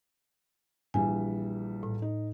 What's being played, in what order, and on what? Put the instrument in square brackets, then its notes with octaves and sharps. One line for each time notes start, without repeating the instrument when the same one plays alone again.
[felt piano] A#1 E3 G3 [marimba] G#5
[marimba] A2
[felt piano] D#4